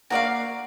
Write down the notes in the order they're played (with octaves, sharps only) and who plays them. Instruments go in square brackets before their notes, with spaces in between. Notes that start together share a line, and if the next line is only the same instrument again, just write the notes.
[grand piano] A#3 [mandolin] F#4 A4 D5 F5